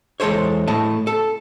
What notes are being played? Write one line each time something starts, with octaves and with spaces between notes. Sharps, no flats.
E2 G#3 A4 C5 C#5
A2 A3 D#5 A5
A4